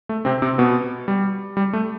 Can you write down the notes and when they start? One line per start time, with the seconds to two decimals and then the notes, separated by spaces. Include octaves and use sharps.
0.09 A3
0.25 C3 C4
0.42 C3 C4
0.58 B2 B3
1.08 G3
1.57 G3
1.73 A3